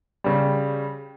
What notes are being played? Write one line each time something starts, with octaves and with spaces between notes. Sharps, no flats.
C#3 G3